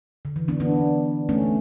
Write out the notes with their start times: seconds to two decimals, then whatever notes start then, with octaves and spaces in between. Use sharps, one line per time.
0.25 D3
0.36 E3
0.48 B3 D4
0.60 B3 D4
1.29 A3 C#4